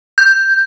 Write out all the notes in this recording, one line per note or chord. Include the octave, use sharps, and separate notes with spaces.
G6